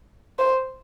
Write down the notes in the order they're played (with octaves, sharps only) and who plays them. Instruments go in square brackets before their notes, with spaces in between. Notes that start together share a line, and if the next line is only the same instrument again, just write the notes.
[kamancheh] C5